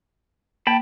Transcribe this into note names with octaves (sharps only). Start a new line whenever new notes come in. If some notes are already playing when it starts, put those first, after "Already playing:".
A#3 G5 A5 B5